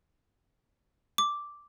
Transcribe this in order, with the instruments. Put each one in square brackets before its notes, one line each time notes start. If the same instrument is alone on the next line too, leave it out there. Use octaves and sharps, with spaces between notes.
[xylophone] D6